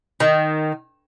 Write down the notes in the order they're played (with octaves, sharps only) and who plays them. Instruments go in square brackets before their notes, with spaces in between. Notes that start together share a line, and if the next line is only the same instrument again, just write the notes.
[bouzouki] D#3